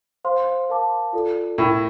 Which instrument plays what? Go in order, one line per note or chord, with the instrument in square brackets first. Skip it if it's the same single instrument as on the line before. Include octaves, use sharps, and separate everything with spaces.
[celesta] C5 F5 C6
A#4 F5 A5 D6
F4 A4 D5
[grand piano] A2 [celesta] A#4 E5 G5